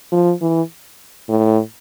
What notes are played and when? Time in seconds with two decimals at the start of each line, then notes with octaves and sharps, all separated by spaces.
0.12 F3
0.42 E3
1.29 A2